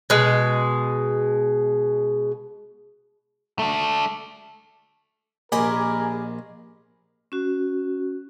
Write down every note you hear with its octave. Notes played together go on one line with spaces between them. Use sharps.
B2 G#3
A3 D4
A#1 G4 G#4 A#4 D#5 G#5 B5 D6
C#4 F#4